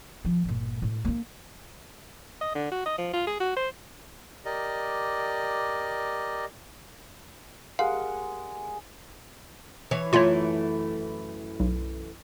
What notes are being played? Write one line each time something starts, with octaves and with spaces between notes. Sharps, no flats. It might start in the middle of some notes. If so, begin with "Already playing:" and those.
F3
G1 A#2
A2
A#3 D4
D#5
D3
F#4
D#5
F3
F4
G#4
F#4
C5
G4 A#4 D5 D#5
G#3 G4 A#4 F5 F#5
E3 C#5
F#2 E3 A3 F4 C#5
B1